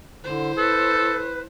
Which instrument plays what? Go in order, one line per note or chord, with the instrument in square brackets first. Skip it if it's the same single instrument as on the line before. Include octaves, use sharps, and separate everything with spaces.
[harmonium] D3 [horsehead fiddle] E4 C5
[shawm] A4 [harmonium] B4